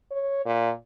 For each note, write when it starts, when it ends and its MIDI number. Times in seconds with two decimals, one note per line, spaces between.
0.11 0.41 73
0.45 0.71 46